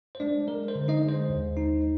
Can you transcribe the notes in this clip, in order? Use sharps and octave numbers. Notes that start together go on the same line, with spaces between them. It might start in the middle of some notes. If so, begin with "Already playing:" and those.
C5
G#3 D4 D5
G#3 A#4
C5
D3
D#4 D#5
G#3
C5
D#2
D#4